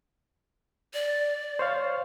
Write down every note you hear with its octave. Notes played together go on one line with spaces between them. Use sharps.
D5
C5 C#5 F5